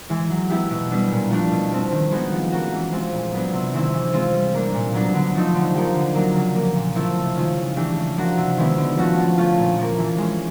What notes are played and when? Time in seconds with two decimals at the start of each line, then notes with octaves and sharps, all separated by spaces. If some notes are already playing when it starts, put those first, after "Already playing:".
0.10 E3 G#3
0.30 F#3
0.50 B3 E4 G4
0.70 B2
0.91 G3 B3 D4
1.11 A#2
1.30 F3 A3 D4
1.51 B2
1.71 G3 C4
1.92 D#3
2.11 G#3 B3 D#4 F#4
2.32 F3
2.52 A#3 C#4 F#4
2.72 E3
2.92 G#3 C4 F4
3.12 A#2
3.33 F#3 B3 D4
3.52 C3
3.73 D#3 G#3 C4 E4
3.93 E3
4.13 G#3 C4 F4
4.33 G3
4.54 A#3 D4
4.74 A#2
4.94 F#3 B3 D4
5.14 D3
5.35 F3 A3 C4 D#4
5.55 D3
5.75 F3 A#3 D#4 G4
5.95 D3
6.15 F#3 A#3 D4
6.35 C#3
6.55 F3 A#3
6.75 A#2
6.96 F3 A3 C4 E4
7.16 C3
7.36 D#3 G#3 C#4 F4
7.56 C#3
7.76 E3 A3 D4 G4
7.96 C#3
8.17 F3 A#3 D4 F#4
8.37 C3
8.57 D#3 G#3 B3 E4
8.78 D3
8.97 F3 A3 C#4 F#4
9.17 F3
9.38 A3 C#4 F4
9.58 A#2
9.79 F3 A#3
9.98 E3
10.18 G#3 C#4